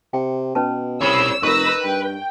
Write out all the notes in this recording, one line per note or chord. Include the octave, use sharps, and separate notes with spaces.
C3 G5
B2 C#4 B4 A5
C2 C#5 B5 E6
F1 D#4 A#4 B4 C#6 E6 A#6
G2 G5